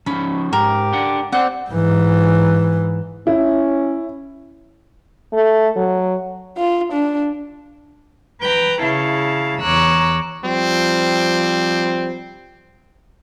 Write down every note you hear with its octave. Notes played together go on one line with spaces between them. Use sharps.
F3 C#4 D#4 B5
G#2 G4 A#4
D4 F#5
C4 C5 D5 F#5
G#2 E3
C#4 E4
A3
F#3
F4
D4
B4 G5 A#5
C#3 E4 F5 A5
E2 C#5 A#5 D6 E6 F#6
F3 G3 C4